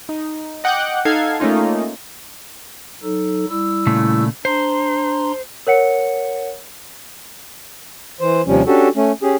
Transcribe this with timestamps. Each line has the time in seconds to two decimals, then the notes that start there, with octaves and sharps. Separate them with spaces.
0.09 D#4
0.64 D#5 F#5 G5 D6 F#6 G6
1.05 D#4 A4 F5 F#5 G#6 C7
1.40 A3 A#3 C#4 D#4 F4
3.03 F#3 D#4 A4
3.50 G3 E4 E6
3.87 A#2 C#3 A3
4.45 D4 C5 A#5 C6
5.67 A#4 C#5 F#5 C#7
8.20 E3 C5
8.47 D#2 C3 F3 G3 C#4
8.67 C#4 D4 F#4 G4 A4
8.96 A3 C#4
9.22 C#4 G4 G#4